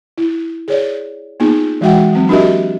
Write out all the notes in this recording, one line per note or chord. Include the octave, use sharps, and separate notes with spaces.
E4
G#4 C#5 D5
A#3 B3 D#4 F4 G#4
E3 G#3 F#4 E5 F#5 G5
F#3 C4
D4 F#4 G4 A#4 D#5 E5